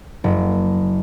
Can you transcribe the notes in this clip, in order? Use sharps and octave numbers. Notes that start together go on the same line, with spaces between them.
F#1